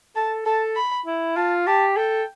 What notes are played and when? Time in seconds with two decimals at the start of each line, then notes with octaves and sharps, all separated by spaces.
0.16 A4 A5
0.46 A4 A5
0.76 B5
1.06 E4
1.36 F4 A5
1.67 G4 A5
1.97 A4 G5